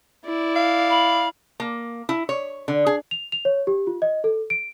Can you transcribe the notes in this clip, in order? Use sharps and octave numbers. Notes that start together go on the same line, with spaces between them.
E4 D5
F5
B5
A#3
E4
C#5
D3
G#4
F7
F7
C#5
G4
F4
D#5
A4
D7